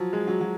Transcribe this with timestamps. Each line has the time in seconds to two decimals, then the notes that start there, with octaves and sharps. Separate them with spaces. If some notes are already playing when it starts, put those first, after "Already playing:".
Already playing: F3 F#3
0.13 G#3
0.27 F#3
0.41 F#3